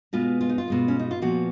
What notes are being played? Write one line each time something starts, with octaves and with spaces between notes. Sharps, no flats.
B2 G#3 B3 F4
F4
D#4
F4
B2 G#3 B3
C#4
D#4
F4
A#2 F3 B3 F#4